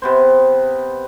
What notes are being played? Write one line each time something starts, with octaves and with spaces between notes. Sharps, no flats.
C3 B3 C5